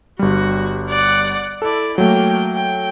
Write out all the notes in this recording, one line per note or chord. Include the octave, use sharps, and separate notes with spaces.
G1 G3 F#4
D5 F#5
E4 A4 D5
F#3 A3 A#3 G5
G5